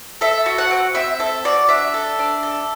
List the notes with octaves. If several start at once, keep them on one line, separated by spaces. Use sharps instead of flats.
A4 E5
F#4
F#5
C4
C4 E5
A4 E5
F#4 D5
D4 E5
A4
D4
A4